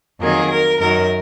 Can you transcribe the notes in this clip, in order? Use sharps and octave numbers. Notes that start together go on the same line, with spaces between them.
F2 D#3 F#3 A#3 G#4
A#4
F#2 D#3 F#3 A#4